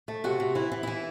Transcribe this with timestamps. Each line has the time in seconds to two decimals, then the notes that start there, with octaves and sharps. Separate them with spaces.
0.08 A3
0.24 C3 F#4
0.40 C3
0.55 E3 E4
0.72 E3
0.83 E3 E4